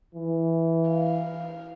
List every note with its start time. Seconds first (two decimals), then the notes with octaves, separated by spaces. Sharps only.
0.15 E3
0.90 F5